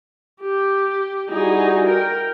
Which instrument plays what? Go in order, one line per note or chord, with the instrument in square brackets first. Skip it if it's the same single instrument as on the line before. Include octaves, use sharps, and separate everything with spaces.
[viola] G4
[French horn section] G3 E4 F#4 [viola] D#4 G#4
[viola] A#4 G5